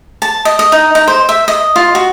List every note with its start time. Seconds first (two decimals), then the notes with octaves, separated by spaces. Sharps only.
0.22 A5
0.45 D#5
0.59 D#5
0.72 D#4
0.95 D#4
1.08 C5
1.29 E5
1.48 D#5
1.76 F4
1.95 F#4